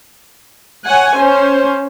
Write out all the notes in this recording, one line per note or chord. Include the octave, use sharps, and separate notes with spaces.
C#5 F#5 G#5
C#4 C5